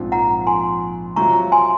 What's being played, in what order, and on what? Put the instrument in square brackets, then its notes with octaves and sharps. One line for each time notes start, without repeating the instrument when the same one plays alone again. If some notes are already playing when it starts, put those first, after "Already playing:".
Already playing: [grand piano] A#1 G#2 F3 C4 F4
[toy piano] F#5 A#5
G#5 C6
[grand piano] C3 F#3 C4 F4 [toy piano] A#5 C#6
[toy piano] G#5 C6